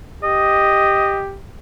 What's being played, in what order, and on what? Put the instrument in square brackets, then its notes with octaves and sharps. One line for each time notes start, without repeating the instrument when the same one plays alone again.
[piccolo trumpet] G4 [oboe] D#5